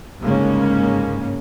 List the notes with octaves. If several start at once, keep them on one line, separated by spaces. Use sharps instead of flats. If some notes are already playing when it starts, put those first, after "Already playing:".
G1 G#2 C#3 G#3 A#3 C#4